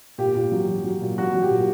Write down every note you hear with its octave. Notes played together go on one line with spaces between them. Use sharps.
A#2 G4
A#2
F#3
F#3
F#3
A#2
F#3 F#4
F#3
G4
A#2